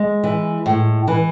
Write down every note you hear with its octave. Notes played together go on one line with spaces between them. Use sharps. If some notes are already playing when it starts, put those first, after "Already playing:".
Already playing: G#3
E3
A2
E3